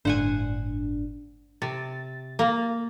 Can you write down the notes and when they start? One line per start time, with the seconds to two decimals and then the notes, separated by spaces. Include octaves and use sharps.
0.05 G1 A2 D4 C5 F#5 G#5
1.62 C3 A6
2.39 A#3